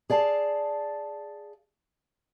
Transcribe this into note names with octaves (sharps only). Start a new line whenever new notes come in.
G#4 D5 F5 A5